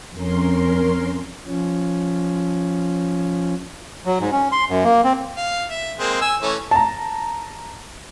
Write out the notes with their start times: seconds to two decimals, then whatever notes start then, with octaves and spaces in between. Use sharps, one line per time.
0.15 F2 C#4 A#4 C6
1.46 F3 C#4
4.06 F#3
4.20 G#2
4.32 C#4
4.52 C6
4.69 F#2
4.84 A#3
5.04 C4
5.37 F5
5.70 E5
5.99 G#3 A#3 C4
6.21 G#5 E6
6.42 E3 A3 C#4
6.71 A5 A#5